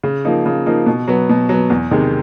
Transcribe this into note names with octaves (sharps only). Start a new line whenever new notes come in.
C#3
F3 A#3 D#4
C#3
F3 A#3 D#4
B2
F#3 B3
B2
F#3 B3
E2
C3 D#3 G#3